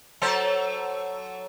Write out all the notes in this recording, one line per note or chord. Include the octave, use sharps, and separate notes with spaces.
F#3 A4 C5